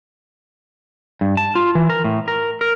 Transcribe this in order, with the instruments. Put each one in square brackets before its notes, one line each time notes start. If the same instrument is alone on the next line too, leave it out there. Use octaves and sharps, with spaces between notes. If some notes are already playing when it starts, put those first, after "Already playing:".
[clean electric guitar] G2
A5
F4
E3
A#4
A2
A#4
A#4